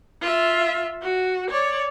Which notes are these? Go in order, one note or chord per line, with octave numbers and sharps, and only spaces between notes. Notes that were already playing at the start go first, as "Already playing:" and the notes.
F4 E5
F#4
C#5 D5